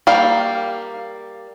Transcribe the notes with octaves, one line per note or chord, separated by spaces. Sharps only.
G3 A#3 F5